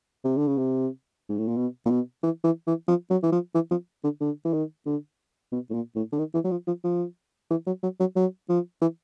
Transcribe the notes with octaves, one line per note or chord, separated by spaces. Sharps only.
C3
D3
C#3
C3
G#2
A2
A#2
B2
A#2
B2
E3
E3
E3
F3
F#3
E3
F3
E3
F3
D3
D3
E3
D#3
D3
B2
A2
A#2
A2
D3
D#3
E3
F#3
F3
F3
F3
E3
F#3
F#3
F#3
F#3
F3
E3